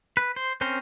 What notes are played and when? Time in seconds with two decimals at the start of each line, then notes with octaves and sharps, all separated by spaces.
0.17 B4
0.36 C5
0.61 C4 C#4 A#4 C5